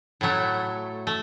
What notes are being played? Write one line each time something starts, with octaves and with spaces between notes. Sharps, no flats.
A2 F#3 A3
A3